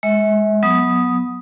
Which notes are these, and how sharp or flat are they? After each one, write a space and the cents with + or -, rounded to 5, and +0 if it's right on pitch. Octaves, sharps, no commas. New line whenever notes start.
G#3 +0 E5 -35
F#3 -15 B3 +0 D#6 +0